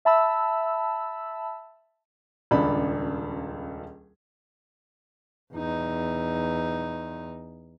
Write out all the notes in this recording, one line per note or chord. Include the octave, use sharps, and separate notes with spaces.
E5 A5 B5 E6
D#1 C#2 D4 B5
E2 D#4